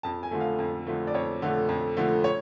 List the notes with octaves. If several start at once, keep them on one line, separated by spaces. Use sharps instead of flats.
F2 A5
G#5
D3 F3 A3
F5
F2
D3 F3 A3
D5
F2 C#5
D3 F3 A3
F2
D3 F3 A3
C#5